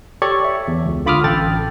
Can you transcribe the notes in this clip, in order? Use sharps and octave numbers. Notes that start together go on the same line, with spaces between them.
G4 A4 C#5 D5 C#6
E5
E2
C#2
D3 F4 B5 D6 D#6 F6
A1 A4 G5 A6